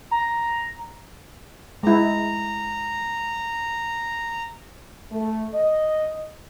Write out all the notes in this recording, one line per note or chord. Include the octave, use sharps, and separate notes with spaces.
A#5
G#3 E4 A#5
A3
D#5